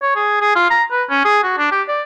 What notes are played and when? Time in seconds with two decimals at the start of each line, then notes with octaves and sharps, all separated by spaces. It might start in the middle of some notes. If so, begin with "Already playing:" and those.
0.02 C#5
0.15 G#4
0.41 G#4
0.55 F4
0.70 A#5
0.91 B4
1.10 C#4
1.25 G#4
1.44 F#4
1.58 D4
1.72 G4
1.88 D5